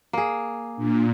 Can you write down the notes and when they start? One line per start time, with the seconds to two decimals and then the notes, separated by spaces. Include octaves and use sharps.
0.13 A#3 G#4
0.77 A#2 D4